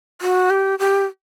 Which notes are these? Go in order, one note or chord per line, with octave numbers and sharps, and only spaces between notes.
F#4
G4
G4